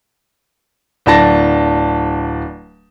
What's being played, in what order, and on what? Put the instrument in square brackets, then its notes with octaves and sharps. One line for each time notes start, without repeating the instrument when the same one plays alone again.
[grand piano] D1 D4 A5 A#6